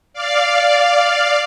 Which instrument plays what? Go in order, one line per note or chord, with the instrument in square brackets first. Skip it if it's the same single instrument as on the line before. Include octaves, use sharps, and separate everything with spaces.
[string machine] D5 F5